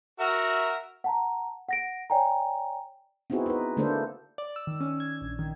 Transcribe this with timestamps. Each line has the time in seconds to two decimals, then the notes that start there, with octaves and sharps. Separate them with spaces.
0.20 F#4 A#4 E5
1.04 F#5 A5 A#5
1.68 F#5 A#6 D7
2.10 C#5 D5 G5 G#5 A#5
3.30 B3 C4 D#4 E4 F#4 G#4
3.46 D#4 B4
3.77 D3 A3 A#3 D4 A4 C5
4.38 D5
4.56 E6
4.67 D#3
4.80 C#4
5.00 G#6
5.21 A#1
5.39 D#3